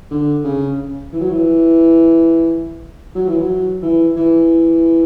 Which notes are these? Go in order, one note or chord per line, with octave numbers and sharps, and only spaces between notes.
D3
C#3
E3
F#3
E3
F#3
E3
F#3
E3
E3